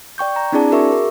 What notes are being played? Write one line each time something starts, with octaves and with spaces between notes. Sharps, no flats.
D5 G5 C#6 G6
A#5
C4 D4 E4 G#4 D5 A5
F#4 G#4 A#4 E5 C#6 D6
A#4